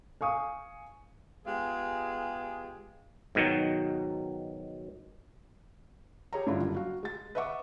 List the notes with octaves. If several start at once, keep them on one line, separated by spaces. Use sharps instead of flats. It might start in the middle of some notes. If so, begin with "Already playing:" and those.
F5 G#5 C#6 D#6
G#3 B3 F4 G4 G#4
G#2 B2 D#3 F#3
G4 G#4 C#5 A#5
G2 D3 G3 E4 F4
F#1
F#4 F5
G#3 A6
B4 D#5 E5 F#5 C#6 D6